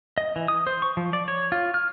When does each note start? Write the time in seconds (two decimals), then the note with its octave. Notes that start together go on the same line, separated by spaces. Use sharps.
0.18 D#5
0.36 E3
0.48 D#6
0.67 C5
0.82 C#6
0.97 F3
1.13 D5
1.28 C#5
1.52 F4
1.74 F6